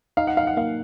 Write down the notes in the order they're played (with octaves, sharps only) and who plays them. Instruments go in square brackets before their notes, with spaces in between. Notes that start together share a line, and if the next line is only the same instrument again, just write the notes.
[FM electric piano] D#4 [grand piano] F5
[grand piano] F#5
[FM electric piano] D#4 [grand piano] F5
[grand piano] F#5
[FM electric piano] A#3 [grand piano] F5